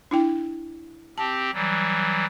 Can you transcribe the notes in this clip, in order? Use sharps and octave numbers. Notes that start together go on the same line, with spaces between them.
D4 E4 G5
C4 G4 A5
E3 F#3 G3